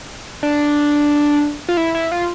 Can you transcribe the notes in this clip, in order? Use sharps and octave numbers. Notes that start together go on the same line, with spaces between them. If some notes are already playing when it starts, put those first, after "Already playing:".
D4
F4
E4
E4
F4